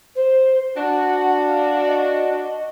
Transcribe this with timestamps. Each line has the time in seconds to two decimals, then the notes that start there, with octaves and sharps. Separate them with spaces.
0.15 C5
0.77 D4 F#4 F#5
1.48 F5
1.87 D#5
2.37 D#5